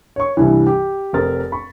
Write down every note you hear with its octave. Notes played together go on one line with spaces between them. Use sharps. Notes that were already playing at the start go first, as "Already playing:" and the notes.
C#5 C#6
C2 G2 C3 E3
G4
F1 F2 A#4 A6
B5 C#6